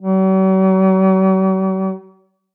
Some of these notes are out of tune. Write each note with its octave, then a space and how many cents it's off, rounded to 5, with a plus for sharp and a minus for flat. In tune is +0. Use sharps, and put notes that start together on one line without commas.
F#3 +45